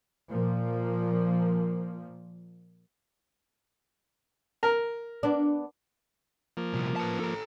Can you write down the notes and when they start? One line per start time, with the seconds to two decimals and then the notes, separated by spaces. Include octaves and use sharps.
0.29 A#2 F3 A#3
4.63 A#4
5.23 B3 D4
6.57 F3 A#3
6.74 C2 A#2
6.96 B4 A5
7.20 A4 A#5